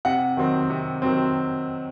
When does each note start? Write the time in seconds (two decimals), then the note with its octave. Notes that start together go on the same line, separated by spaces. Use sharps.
0.05 C3 F#5
0.37 D#3 F#3 C4
0.70 C3
1.02 D#3 F#3 C4